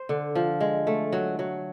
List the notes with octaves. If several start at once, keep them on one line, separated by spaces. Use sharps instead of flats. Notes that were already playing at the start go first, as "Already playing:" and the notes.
Already playing: C5
D3
F3
G#3
A3
F#3
F#3